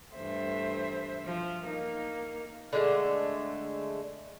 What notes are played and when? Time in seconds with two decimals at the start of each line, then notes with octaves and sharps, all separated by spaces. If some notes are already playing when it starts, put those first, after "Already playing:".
0.15 G2 E3 A3 C5 E5
1.25 F3
1.66 A#3 D#4
2.73 D3 G#3 A3